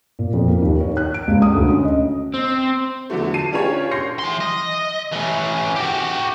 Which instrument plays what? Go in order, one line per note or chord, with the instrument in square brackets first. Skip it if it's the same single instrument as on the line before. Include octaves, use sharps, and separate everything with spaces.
[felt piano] A#2
F2
A#3
D#2
C#5
F#6
D7
C#2
D#6
D2
C#4
D#5
[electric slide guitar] C4
[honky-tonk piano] E2 D3 F3 F#3 A3
A5 C7 D#7
C#4 D4 F4 G4 G#4 C#5
C6 G6 A#6 C7 C#7
[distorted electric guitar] E3 C6
D#5
E3 C#4
F#4 G4